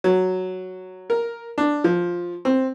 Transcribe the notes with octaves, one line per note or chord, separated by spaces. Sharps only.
F#3
A#4
D4
F3
C4